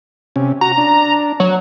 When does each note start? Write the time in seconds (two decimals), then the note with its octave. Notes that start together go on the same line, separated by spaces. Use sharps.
0.36 C3 C#4
0.61 F#4 A#5
0.78 D4
1.40 F#3